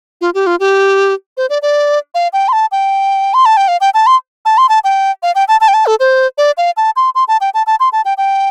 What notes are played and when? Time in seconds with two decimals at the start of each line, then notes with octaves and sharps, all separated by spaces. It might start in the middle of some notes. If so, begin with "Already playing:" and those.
0.21 F4
0.34 G4
0.47 F4
0.60 G4
1.37 C5
1.50 D5
1.62 D5
2.15 F5
2.33 G5
2.48 C6
2.53 A5
2.72 G5
3.34 C6
3.45 A5
3.57 G5
3.68 F5
3.81 G5
3.94 A5
4.07 C6
4.45 A5
4.58 C6
4.69 A5
4.84 G5
5.23 F5
5.35 G5
5.48 A5
5.61 A5
5.68 G5
5.74 A5
5.86 A4
6.00 C5
6.38 D5
6.57 F5
6.77 A5
6.96 C6
7.15 C6
7.28 A5
7.41 G5
7.54 A5
7.67 A5
7.80 C6
7.93 A5
8.05 G5
8.18 G5